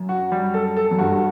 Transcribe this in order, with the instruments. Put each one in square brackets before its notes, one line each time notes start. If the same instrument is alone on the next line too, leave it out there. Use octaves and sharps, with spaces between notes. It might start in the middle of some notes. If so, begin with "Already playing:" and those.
Already playing: [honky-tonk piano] F#2
[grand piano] F#4
G3
A4
A4
[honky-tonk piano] F#2
[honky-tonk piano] G2 [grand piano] F#4